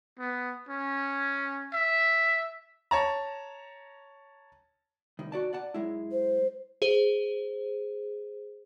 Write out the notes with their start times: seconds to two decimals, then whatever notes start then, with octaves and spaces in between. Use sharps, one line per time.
0.19 B3
0.69 C#4
1.73 E5
2.91 C#5 A5 A#5
5.19 C2 D#3
5.32 F#4 D5 A5
5.53 D5 F#5 A5
5.74 F#2 G#3 E4
6.12 C5
6.82 G#4 C5